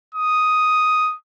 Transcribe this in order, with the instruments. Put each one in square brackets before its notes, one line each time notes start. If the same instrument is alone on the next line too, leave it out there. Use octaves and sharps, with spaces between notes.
[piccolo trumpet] D#6